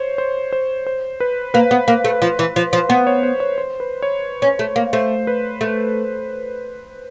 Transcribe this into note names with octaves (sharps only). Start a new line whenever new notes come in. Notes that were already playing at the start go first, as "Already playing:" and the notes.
Already playing: C5 C#5
C5
C5
C5
B4
A#3 B4
B3
A#3
A3
F3
E3
F3
F3
B3 C5
C#5
C5
C#5
C5
B4
C#5
C#4
A3
A#3
A3 C5
B4
A3